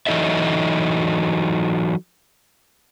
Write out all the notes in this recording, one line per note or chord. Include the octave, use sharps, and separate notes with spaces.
E3 F#3 D#4 A4 D#5 E5